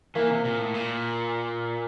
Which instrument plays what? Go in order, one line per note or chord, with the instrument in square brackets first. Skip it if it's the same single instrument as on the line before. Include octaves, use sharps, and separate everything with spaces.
[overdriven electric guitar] E3 [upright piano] A#3
[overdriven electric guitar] C3
A#2
A2
A#2